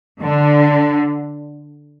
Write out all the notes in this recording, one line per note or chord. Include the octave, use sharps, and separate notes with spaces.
D3